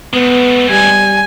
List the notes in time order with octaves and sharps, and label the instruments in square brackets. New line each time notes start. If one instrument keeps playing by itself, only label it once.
[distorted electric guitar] G#3 A3 [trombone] B3
[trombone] G3 [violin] G#5